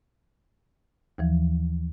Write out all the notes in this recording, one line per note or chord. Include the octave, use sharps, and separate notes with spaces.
D#2 E3 F3